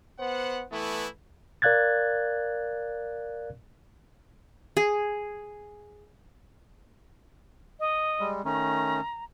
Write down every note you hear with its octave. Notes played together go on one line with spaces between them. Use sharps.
B3 C5 F#5
E3 A3 B3 E4
A#4 D5 F5 F#6 G#6 A6
G#4
D#5
G3 G#3
D#3 A3 C#4 A#5